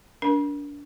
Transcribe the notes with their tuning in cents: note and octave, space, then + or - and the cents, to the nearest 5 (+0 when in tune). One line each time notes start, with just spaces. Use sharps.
D4 -25 A#4 +20